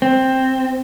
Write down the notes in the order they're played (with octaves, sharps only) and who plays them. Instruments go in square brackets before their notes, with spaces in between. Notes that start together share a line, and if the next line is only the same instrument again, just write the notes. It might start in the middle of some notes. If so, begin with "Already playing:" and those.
[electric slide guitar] C4